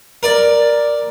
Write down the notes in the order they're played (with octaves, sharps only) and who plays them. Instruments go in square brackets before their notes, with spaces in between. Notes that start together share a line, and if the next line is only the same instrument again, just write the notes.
[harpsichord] A#4 D5